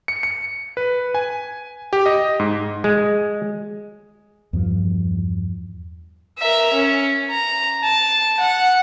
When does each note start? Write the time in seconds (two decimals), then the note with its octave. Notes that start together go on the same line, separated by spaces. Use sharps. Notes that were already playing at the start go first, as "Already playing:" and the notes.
0.08 C#7
0.23 C#7
0.77 B4
1.15 G#5
1.93 G4
2.06 D#5
2.40 G#2
2.84 G#3
4.53 E2 G2 F3
6.39 A#4 E5
6.74 C#4
7.31 A#5
7.84 A5
8.40 F#5